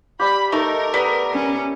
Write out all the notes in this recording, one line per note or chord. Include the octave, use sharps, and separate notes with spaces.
G3 G4 B5
A3 D#4 A#4
G3 B3
C#4